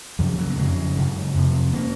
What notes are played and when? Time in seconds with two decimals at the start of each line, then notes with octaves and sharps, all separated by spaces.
0.19 F#2 C#3 F3
0.38 F#3
0.50 A#3
0.57 F2 C#3 G#3
0.96 F#2 C#3
1.34 F2 C3
1.73 C#3 A#3